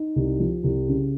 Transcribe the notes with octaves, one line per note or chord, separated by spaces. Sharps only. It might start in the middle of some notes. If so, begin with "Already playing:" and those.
Already playing: D#4
C2
F3
C2
C#3